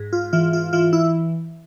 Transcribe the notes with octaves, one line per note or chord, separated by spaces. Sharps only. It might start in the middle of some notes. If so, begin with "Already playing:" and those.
Already playing: G#2
F4
E3 F4
F4
E3 F4
E4